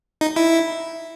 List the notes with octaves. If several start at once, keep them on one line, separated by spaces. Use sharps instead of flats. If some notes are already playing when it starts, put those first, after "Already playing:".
D#4
E4